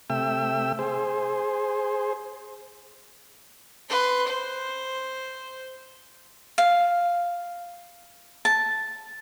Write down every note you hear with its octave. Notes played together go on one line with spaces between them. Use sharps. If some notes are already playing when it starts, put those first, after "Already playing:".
C3 A3 E5 G5 E6
G#4 C5
B4 C6
C5
F5
A5